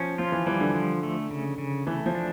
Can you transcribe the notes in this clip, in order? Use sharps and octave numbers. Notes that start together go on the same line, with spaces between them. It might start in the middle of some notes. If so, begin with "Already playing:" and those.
Already playing: F3 C#4
F3 F4
E3
E3 G3
D3
F3
A3
C#3
C#3
E3 A3
F3
D4